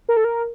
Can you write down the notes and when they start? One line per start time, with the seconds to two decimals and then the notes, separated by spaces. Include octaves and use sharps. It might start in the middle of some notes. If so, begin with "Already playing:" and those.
0.09 A#4
0.17 A4
0.24 A#4